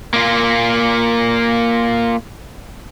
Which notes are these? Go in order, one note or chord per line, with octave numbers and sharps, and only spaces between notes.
A#3 F4